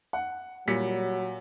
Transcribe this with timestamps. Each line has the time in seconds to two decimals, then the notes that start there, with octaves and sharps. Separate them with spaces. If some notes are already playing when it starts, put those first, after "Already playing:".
0.13 F#5
0.67 A#2 F#3 G3 B6 C#7